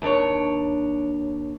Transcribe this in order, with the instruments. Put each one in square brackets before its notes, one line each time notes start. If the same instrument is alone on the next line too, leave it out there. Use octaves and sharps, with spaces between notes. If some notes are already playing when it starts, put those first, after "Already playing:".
[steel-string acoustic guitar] D#2 D4 C#5